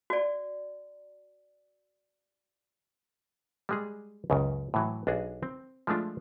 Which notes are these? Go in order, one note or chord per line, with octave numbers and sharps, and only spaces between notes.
F#4 D5
G3 G#3 G#4
C#2 F#2 C#3
A2 E3 F#3
B1 D4 F#4 G#4
C4
F3 G#3 A3 D4 F4